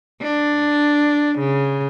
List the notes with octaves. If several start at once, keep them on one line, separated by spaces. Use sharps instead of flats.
D4
C#3